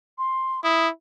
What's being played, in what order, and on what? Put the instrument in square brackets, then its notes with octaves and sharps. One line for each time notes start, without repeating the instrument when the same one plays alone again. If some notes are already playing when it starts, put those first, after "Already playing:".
[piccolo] C6
[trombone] E4 [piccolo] D#6